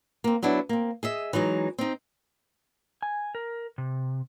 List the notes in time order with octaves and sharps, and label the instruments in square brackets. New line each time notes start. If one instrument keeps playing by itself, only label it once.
[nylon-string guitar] A#3 C4
F#3 B3 D4 E4
A#3 C4
G#4 D#5 E5
E3 F#3 G#3 D#4
C4 D#4
[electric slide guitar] G#5
A#4
C3